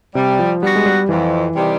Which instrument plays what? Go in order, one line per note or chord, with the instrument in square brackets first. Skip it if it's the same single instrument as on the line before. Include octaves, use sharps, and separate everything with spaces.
[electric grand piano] C3 [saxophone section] G3
[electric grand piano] F3
[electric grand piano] G3 [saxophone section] B3 D4 F#4
[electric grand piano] G#3
G3
[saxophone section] F2 [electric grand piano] E3
[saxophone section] C3 D#3 G3